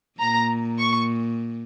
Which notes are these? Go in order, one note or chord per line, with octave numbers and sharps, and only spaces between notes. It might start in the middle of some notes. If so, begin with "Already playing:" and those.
A#2 A#5
C#6